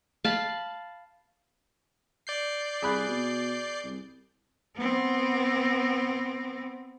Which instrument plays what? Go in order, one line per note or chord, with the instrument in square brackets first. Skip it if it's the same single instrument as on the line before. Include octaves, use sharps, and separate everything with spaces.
[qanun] F5 A5 B5
[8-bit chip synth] D5 G6 C7
[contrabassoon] C2 [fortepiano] G#4 B5 F#6
[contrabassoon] B2
C2
[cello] B3 C4